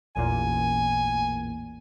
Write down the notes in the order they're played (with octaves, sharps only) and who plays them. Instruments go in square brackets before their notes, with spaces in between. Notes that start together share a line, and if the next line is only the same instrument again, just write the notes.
[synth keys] A1 E2 A#2 [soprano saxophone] G#5